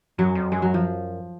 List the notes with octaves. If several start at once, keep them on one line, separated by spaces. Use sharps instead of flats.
F#2 F#3
F2
F#2 G#3
F#3
F3